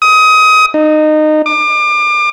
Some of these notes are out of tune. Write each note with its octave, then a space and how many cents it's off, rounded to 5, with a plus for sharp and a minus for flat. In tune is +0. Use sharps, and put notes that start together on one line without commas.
D#6 +25
D#4 -20
D6 +30